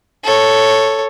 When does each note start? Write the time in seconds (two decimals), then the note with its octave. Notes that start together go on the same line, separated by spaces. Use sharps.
0.24 A4 C#5